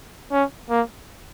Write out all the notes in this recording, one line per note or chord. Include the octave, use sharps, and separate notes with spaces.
C#4
A#3